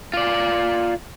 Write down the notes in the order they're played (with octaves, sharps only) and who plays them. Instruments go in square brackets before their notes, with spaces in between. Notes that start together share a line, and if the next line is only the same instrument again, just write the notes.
[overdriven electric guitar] F4 D5